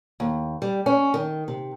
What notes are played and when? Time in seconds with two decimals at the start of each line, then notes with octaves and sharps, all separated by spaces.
0.20 D#2
0.62 G3
0.86 C#4
1.14 D#3
1.48 C3